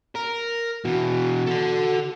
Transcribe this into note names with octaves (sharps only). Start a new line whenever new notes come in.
A#4
B2 E3 F#4
A4 F#5